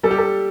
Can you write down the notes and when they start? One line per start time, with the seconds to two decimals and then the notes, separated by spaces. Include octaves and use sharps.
0.03 G3 A4
0.11 G4
0.18 A4